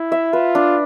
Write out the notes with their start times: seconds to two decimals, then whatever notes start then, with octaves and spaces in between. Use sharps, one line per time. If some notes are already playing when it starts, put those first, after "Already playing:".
Already playing: E4
0.12 E5
0.33 F4 B4
0.55 D4